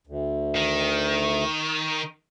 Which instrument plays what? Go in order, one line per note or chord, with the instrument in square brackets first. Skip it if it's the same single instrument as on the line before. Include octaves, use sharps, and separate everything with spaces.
[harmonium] D2
[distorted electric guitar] D#3